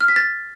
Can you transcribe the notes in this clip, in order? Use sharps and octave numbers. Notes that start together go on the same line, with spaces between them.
F6
B6
A6